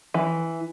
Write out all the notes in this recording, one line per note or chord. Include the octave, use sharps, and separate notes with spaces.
E3